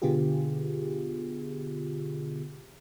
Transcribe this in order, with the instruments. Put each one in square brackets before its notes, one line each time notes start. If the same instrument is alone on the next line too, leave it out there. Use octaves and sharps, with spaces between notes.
[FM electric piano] B2 D3 B3 F4 G4 G#4